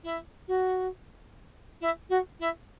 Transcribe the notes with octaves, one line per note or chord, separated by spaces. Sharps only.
E4
F#4
E4
F#4
E4